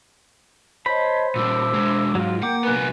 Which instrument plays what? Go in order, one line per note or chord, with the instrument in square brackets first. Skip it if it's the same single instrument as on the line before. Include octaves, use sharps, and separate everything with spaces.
[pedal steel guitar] C5 B5 [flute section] C#5 D#5 A5
[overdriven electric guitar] A#2 G3 [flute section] A5 D6 E6
[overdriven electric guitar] B2 G#3
[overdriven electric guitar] G#2 [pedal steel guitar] F#3 F4
[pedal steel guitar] A#3 D6 [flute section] A#4 G5 G6 [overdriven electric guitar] F#5
[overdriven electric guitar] C2 B3 [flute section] A#4 G#5 F#6